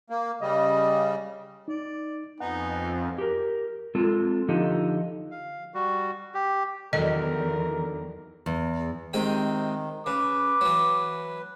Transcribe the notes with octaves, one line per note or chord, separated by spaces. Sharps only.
A#3
C#3 G3 D#5
D#4 D5
F2 B3 D#4 F#5 G#5
G4 A#4
G#3 C4 F4 A4
D3 F3 D#4 G4 A4
F5
G3 F#4
G4
E2 D3 D#3 F#3 A#4 D#5
E2
C3 D#3 G#3 G4
C#3 B4 D6
E3 F#3